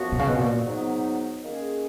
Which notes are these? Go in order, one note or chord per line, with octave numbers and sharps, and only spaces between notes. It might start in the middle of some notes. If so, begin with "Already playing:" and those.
Already playing: F#2 F3 B3 F#4
B2
C#3
B2
A#2
G#2 F#3 B3 D#4
D#3 A#3 C#4 G#4